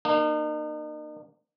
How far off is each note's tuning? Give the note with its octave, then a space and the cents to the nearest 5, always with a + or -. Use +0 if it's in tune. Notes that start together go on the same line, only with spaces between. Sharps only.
A#3 +0 D#4 -40